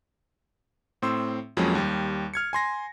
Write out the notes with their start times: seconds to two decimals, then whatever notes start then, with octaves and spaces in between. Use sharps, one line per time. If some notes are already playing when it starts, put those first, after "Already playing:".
1.02 A2 C4 C6 E6
1.57 F2 F3 F#3 G#3 A#3 C#4
1.75 D#2 G3
2.34 F6 G#6 C#7
2.53 G#5 C6 A#6